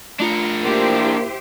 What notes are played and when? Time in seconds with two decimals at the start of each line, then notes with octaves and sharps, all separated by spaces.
0.20 A3 D4 F4 A#4 C#7
0.64 A#3 E4 G4 C5